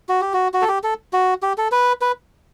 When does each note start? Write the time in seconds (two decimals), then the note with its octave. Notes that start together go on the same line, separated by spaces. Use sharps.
0.09 F#4
0.21 G4
0.34 F#4
0.54 F#4
0.62 A4
0.68 G4
0.83 A4
1.13 F#4
1.43 G4
1.58 A4
1.72 B4
2.01 B4